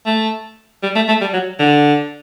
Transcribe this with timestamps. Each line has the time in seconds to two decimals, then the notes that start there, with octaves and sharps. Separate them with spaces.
0.06 A3
0.83 G3
0.96 A3
1.08 A3
1.21 G3
1.33 F#3
1.59 D3